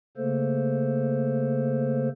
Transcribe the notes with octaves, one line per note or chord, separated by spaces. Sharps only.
C#3 A3 A#3 A4 C5